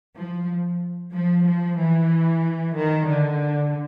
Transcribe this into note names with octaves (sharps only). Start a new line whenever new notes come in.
F3
F3
F3
E3
D#3
D3